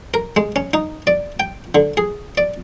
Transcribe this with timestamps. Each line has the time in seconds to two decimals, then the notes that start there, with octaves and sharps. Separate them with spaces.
0.14 A#4
0.37 G#3
0.56 C#4
0.73 D#4
1.07 D5
1.40 G5
1.75 D3
1.97 G#4
2.38 D5